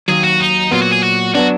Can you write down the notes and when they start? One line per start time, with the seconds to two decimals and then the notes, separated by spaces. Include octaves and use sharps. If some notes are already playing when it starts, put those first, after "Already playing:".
0.08 D#2 D#3 F#3 G#4
0.24 F#4
0.40 D#4
0.71 A#2 F#3 B3 F4
0.82 F#4
0.93 G#4
1.03 F#4
1.35 F#3 B3 D4 F#4